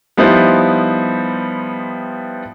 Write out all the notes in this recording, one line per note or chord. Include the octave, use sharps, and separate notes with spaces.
F3 G3 B3 D#4 E4 C5